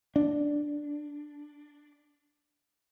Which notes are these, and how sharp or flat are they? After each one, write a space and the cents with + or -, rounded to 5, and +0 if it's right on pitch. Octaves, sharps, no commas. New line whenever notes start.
D4 +0